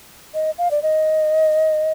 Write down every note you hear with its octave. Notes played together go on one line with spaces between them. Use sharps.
D#5
F5
D5
D#5